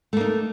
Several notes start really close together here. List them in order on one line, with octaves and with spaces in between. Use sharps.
A3 A#3 D#4